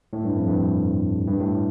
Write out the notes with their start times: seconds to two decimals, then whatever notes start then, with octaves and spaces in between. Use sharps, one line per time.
0.13 A2
0.24 G2
0.36 F2
0.47 G2
1.28 G2
1.40 A2